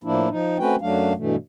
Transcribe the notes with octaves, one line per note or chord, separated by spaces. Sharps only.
A2 F3 A#3 D4 E4
F3 D#4
A3 C4 C#4 F#4 B4 G5
F#2 F#3 A3 D4 F5
G2 B2 E3 A3